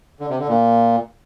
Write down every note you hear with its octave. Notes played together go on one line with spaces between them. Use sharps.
D3
C3
D3
A#2